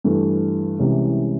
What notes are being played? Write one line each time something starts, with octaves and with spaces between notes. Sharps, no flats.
G2 E3 A3
C2 C3 E3 G#3 C#4